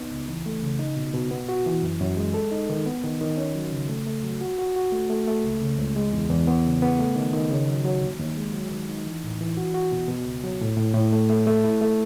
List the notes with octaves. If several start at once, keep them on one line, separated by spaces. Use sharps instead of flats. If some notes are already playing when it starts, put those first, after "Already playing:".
Already playing: C#2 B3 D#4
C#2
E3
A3
C#3
D#4
B2
B2
B3
F#4
E3
F#2
F#2
G#3
A4
D#4
D#3
B3
D#3
D#3
C#4
F#3
C#3
A3
A3
F#3
F#4
F#4
F#4
A3
A3
A3
C#2
C#3
C#2
G#3
E2
E2
B3
C#3
B3
A3
D#3
D#3
C#3
F#3
F#3
D#2
D#2
G#3
F#3
D#3
D#4
E3
A2
E3
F#4
F#4
B2
B2
C#2
F#3
A2
A2
A2
A3
A3
A3
E4
A3